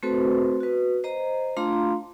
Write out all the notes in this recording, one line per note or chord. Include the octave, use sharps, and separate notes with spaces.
A3 C4 F#4 A4 B4 C5
F#4 B4
C5 D#5 A#5
A3 D4 F4 F5 A#5 C6